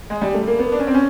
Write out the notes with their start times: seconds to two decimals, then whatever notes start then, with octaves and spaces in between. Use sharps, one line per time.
0.10 G#3
0.22 G3
0.34 A3
0.47 A#3
0.59 B3
0.72 D4
0.79 C#4
0.87 C4
0.94 C#4